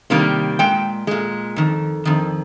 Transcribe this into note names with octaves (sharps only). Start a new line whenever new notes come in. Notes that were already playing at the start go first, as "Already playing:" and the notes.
C3 D#3 G3 A#3
A#2 G#3 G5
A#2 G#3
F2 D#3
F2 D#3